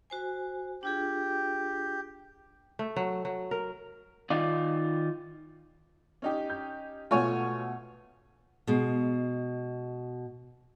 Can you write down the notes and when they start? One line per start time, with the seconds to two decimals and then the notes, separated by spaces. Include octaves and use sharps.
0.10 F#4 C5 G#5
0.83 D4 F4 G4 G#4
2.79 A3
2.96 F#3
3.25 F#3
3.51 A#4
4.30 D#3 D#4 F4 D5
6.22 C#4 D#4 G4
6.50 G6
7.11 B2 A3 F4 C#5 G#5
8.67 B2 G#3